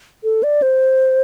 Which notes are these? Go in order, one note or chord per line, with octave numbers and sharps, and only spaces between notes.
A4
D5
C5